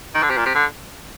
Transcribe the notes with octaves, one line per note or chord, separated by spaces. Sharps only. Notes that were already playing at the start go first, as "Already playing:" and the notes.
D#3
D3
C3
A#2
C3
D3